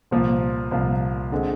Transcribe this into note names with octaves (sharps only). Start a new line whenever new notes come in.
C2 A#2 F3 A#3 F4
C2 A#2 F3 A#3 F4
D3 G#3 C4